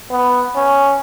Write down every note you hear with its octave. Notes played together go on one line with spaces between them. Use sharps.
B3
C#4